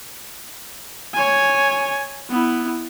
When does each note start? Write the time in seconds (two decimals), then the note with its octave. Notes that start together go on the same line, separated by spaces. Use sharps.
1.14 C#5 G#5
2.30 B3 E4